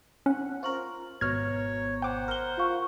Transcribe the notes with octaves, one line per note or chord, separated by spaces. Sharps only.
C#4 F#5
F4 A#4 C5 C#6 F#7
G#1 B2 C#5 A#5 F6 G#6
C5 F#5 G5 D6
A#4 F6 G7
F4 F5 C#6